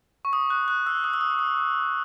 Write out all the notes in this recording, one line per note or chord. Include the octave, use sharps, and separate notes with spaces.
C#6
D#6
F#6
F#6
E6
D#6
E6
D#6
D#6